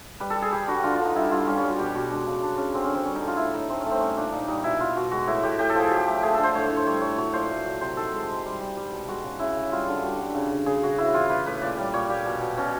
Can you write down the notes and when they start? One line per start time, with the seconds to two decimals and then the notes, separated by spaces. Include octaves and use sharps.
0.20 G3 B4
0.30 A4
0.36 G3
0.42 G#4
0.52 G3 G4
0.67 D3 F#4
0.83 D3 F4
0.95 D3 F4
1.05 D#4
1.15 G3 E4
1.31 G3 F4
1.47 G3 C#4
1.58 C#4
1.63 G3
1.68 F#4
1.79 B2 G4
1.94 B2 F#4
2.11 G#3 D4
2.27 C#3
2.42 G#3 D4
2.57 C#3 C#4
2.73 D3 C4
2.84 C#4
2.89 D3
2.95 C4
3.05 G3 C#4
3.16 D#4
3.21 D3
3.27 F4
3.37 A2 E4
3.53 A2 D#4
3.69 A3 C4
3.80 C#4
3.86 A3
3.91 C4
4.00 G3 C#4
4.17 A#2 D4
4.32 A#2 D#4
4.48 G3 D#4
4.64 B2 E4
4.80 B2 F4
4.96 B2 F#4
5.11 G#3 F#4
5.27 A2 E4
5.43 A2 G4
5.59 A2 G4
5.69 A4
5.75 F3 G#4
5.91 F#3 G4
6.07 A3
6.23 A3 G#4
6.34 D3 A4
6.43 C5
6.55 A2 C#5
6.66 A2 C#5
6.76 C5
6.87 G3 C#5
7.02 A2 C#5
7.18 F#3 C#5
7.33 A#2 C5
7.50 A3
7.66 F#3
7.81 C3 C5
7.97 D#3 A4
8.13 G#3
8.29 G#3
8.45 G3
8.61 G3
8.77 G3
8.92 B2
9.08 G#3 F#4
9.24 C#3
9.39 C#3 E4
9.56 C#3
9.72 G3 F4
9.88 D3
10.03 G3 F#4
10.19 D3
10.35 C#3
10.51 C#3
10.66 C#3 G#4
10.83 C#3 F#4
10.98 E3 E4
11.14 E3 F4
11.30 E3 B4
11.46 A2 B4
11.62 A#2 D5
11.77 G3
11.93 A#2 C#5
12.10 A#2 G4
12.26 B2
12.41 B2
12.57 B2 C#4